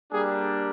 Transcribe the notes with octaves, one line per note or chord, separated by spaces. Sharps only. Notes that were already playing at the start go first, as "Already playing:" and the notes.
G3 A#3 D4 G4 G#4